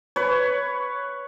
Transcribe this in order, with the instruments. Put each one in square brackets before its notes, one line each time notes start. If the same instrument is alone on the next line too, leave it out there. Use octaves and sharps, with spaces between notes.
[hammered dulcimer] B4 C#5